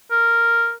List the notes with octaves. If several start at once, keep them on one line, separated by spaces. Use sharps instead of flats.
A#4